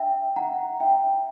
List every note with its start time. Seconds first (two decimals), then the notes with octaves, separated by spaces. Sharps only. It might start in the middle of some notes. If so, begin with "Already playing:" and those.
Already playing: D4 E5 G5
0.36 F#5 A#5
0.80 E5 G5